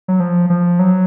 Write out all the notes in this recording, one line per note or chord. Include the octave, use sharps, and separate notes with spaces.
F#3
F3
F3
F#3